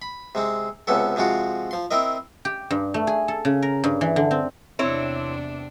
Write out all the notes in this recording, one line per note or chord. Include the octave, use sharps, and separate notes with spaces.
B5
C3 G#3 C4
C#2 C3 B3 C#4 A4
C3 F3 G#3 F4 F#4
F3 C6
C4 E4 A#4 D#5
G4
G2
A3
G#4
A4
C#3
A#4
G2
E3
D3
C4
E2 C3 C4 D4 E4 C#5